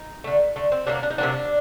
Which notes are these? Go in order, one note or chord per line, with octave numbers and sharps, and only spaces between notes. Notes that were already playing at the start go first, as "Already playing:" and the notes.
Already playing: D#4
D3 A3
D3 A3
C4
C3 F#3 A#3 D4
D4
D#4
C3 F#3 A#3 D4